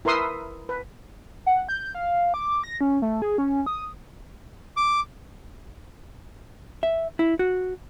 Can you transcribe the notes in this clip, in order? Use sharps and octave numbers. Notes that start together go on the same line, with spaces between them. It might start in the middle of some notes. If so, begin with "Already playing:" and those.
E4 A#4 B4 C6 D#6 E6
B4
F#5
G6
F5
D6
A#6
C#4
A3
G#4
C#4
D#6
D6
E5
E4
F#4